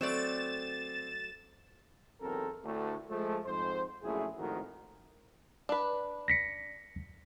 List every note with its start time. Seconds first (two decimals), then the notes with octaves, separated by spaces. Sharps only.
0.01 F#3 A3 C4 D5 A6 E7
2.21 B1 E2 C4 A4 A#4
2.64 D2 A2 A3
3.09 F3 G#3 A3
3.45 F2 G#2 C5
4.03 A#1 F#2 A3 E4 G#4
4.38 G#1 F2 A2 D#3 F#4 A#4
5.69 D4 B4
6.28 A#6 B6 C#7